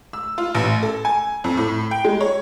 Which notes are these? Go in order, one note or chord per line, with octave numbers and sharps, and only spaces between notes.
E6
F4
A1
A4
G#5
F2
A2
G5
G#3
C#5